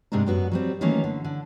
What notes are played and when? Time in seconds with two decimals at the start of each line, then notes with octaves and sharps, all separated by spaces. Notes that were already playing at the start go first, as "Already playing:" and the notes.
0.12 G#2 C3 G#3 A3 D4 A#4
0.27 F#2 B3 F#4
0.52 F#3 G3 C4
0.81 D#3 E3 F#3 A3 A#3 C#4
1.04 D3
1.25 D3